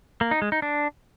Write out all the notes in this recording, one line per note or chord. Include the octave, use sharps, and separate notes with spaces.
A#3
D#4
G#3
D#4
D4